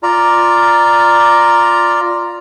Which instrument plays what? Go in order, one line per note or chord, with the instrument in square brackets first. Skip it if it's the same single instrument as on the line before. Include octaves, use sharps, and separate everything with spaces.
[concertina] F4 D5 A#5